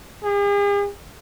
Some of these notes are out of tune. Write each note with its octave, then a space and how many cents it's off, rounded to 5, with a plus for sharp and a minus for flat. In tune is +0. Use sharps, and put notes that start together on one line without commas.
G#4 -45